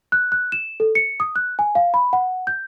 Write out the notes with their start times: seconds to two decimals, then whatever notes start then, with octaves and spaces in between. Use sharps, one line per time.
0.12 F#6
0.32 F#6
0.52 E7
0.80 A4
0.95 C#7
1.20 D#6
1.36 F#6
1.59 G#5
1.75 F5
1.94 B5
2.13 F#5
2.47 G6